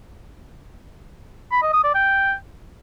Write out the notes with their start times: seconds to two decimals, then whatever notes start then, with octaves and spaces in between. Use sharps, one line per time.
1.51 B5
1.62 D#5
1.73 D#6
1.84 D5
1.95 G5